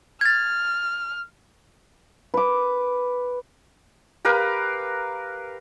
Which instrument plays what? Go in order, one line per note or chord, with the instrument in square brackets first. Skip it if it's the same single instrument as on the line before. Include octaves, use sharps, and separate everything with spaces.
[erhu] F6 [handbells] G#6 A6
[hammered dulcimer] B4 D6
[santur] G4 A#4 B4 F5